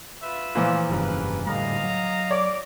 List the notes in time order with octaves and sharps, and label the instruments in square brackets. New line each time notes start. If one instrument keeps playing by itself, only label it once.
[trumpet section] F4 B4 E5
[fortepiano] A#2 E3 F3
[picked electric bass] F1 G2 C#3 [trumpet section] A#4 B4
[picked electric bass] A2 D3 G3 [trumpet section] D#5 F5 A#5
[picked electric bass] F#3
[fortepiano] C#5 D5 [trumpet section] D6